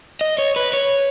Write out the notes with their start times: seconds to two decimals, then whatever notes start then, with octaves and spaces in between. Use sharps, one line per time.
0.21 D#5
0.38 C#5
0.56 B4
0.73 C#5